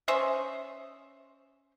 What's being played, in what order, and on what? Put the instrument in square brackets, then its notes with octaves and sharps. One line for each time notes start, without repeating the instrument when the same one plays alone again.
[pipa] C#4 C5 D#5 E5